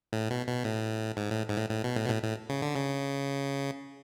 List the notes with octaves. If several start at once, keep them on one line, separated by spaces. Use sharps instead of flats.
A2
B2
B2
A2
G#2
A2
G#2
A2
A2
B2
A2
B2
A2
A2
C#3
D3
C#3